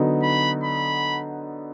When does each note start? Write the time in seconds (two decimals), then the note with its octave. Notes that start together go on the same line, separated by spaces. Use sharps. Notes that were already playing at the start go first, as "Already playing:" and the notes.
Already playing: D3 F#3 B3 D#4
0.22 B5
0.64 B5